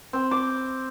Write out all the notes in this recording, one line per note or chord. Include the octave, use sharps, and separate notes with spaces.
C4
D6